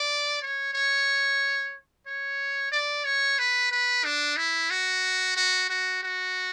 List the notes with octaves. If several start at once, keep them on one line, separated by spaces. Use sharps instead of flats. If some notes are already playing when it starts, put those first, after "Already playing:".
Already playing: D5
C#5
C#5
C#5
D5
C#5
B4
B4
D4
E4
F#4
F#4
F#4
F#4